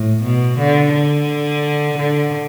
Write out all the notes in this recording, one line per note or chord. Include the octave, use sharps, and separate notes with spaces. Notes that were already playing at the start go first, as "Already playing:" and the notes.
Already playing: A2
B2
D3
D3
D3